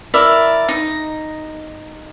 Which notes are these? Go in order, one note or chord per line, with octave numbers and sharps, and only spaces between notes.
E4 A#4 D5 E5
D#4